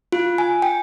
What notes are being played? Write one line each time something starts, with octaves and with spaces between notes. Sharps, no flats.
F4
G#5
G5